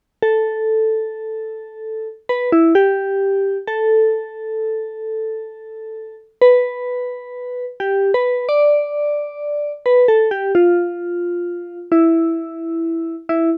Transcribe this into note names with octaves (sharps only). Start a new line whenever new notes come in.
A4
B4
E4
G4
A4
B4
G4
B4
D5
B4
A4
G4
F4
E4
E4